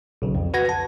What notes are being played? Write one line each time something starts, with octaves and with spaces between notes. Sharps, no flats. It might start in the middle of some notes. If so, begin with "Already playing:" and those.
B1 C#3
F2
F#4 B4 F#5 G#6 A#6
A5